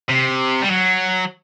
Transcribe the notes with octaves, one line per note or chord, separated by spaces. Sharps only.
C3
G3
F#3